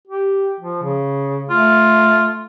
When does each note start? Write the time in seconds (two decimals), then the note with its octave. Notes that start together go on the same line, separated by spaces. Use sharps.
0.08 G4
0.61 F3
0.83 C#3
1.50 A3 F4